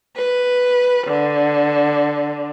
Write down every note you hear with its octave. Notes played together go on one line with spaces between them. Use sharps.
B4
D3